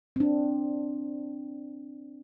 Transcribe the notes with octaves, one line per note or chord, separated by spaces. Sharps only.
C4 D4